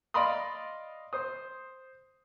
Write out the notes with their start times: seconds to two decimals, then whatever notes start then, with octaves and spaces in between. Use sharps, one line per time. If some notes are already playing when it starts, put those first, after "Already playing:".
0.14 D5 D#5 F5 B5 C6 D#6
1.13 C5 D#6